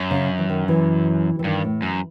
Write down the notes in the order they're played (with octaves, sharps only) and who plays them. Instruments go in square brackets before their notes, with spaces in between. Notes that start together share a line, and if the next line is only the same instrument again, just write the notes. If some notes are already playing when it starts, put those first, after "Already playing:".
Already playing: [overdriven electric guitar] F#2
[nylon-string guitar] C#3
E3
D#3
E3
E3
[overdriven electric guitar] G2 [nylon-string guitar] D#3
[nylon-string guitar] A2
[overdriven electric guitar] F#2